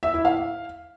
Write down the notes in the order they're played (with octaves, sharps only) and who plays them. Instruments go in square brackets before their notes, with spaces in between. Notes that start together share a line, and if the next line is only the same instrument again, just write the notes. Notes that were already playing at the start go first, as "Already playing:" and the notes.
[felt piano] E5
E4
F5